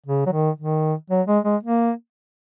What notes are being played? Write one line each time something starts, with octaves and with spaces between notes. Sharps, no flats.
C#3
F#3
D#3
D#3
F#3
G#3
G#3
A#3